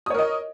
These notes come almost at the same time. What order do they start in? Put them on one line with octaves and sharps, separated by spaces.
D#6 C#5 A#4 D#5